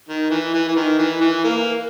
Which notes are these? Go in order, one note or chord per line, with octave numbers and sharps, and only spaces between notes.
D#3
E3
E3
E3
D#3
E3
E3
A#3